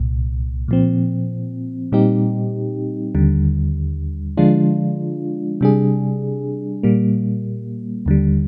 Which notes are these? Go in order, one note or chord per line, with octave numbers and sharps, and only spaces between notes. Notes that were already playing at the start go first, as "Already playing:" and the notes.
Already playing: C2 A#2
A#2 F3 C4
A#2 G3 C4 D#4 G4
D#2 D3 G3
D3 F3 G#3 D4 F4
C3 G3 D4 G#4
A#2 G3 A#3
D#2 D3 G3